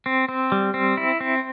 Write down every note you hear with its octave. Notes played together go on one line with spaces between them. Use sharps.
C4
C4
G3
C4
E4
C4